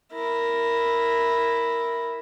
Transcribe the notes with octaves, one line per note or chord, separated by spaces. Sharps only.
E4 A#4